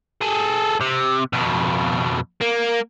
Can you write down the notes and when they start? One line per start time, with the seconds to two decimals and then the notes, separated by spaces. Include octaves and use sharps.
0.21 G#4 A4
0.81 C3
1.33 F2 B2
2.41 A#3